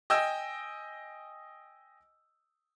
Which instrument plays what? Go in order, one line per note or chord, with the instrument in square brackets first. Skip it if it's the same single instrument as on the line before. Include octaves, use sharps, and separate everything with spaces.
[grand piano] D#5 G5 G#5 E6